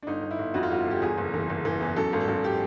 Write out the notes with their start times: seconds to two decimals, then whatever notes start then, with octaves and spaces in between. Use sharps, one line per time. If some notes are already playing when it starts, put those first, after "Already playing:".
0.02 D4
0.07 G1 D#4
0.23 G1
0.31 E4
0.39 G1
0.54 F2 F#4
0.63 F4
0.70 G1 F#4
0.86 G1 G4
1.02 E2 G#4
1.18 F#1
1.34 E3
1.50 F#1
1.65 E3
1.81 E2
1.96 F#2 A4
2.13 G#1
2.20 A4
2.28 F#2
2.44 G4